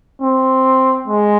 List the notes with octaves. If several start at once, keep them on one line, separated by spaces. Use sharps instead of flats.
C4
G#3